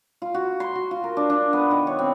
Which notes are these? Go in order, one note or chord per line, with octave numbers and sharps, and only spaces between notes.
F4
F#4
C6
F#4
F4
A#4
D4
D4
B3
D#3
C#5
C4